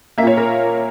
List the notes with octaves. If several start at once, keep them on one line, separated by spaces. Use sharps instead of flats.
A#2 A#3 C#5 E5
A#4